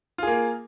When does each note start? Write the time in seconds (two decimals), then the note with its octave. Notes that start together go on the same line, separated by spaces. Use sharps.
0.18 F4
0.23 G#4
0.27 A#3